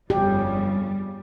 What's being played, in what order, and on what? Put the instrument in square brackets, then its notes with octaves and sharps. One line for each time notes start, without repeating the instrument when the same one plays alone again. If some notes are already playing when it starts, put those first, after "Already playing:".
[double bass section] G1 F2 C#3 [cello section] G3 [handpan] G4